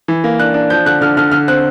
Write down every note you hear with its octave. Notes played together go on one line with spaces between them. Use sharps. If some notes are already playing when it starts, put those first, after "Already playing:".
E3
A#3
D4 F#6
D4
F3 G6
D3 F#6
D3 F6
D3 F6
D3 F6
C4 F#6